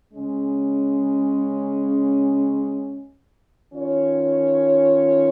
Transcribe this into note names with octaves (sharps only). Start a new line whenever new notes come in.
C#3 G#3 C#4
D#3 C#4 F4 C#5